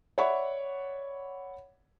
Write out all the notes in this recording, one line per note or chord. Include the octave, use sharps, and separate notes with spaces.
C#5 D5 E5 F#5 B5 C#6